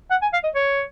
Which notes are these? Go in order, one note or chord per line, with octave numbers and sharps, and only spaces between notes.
F#5
G#5
F5
D#5
C#5